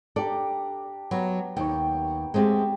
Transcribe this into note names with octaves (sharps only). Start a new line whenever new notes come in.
D4 G4 A4 D5 A#5
F#3 B3 A#5
D#2 C#5 G5
G#3 A3 C4 G4 A5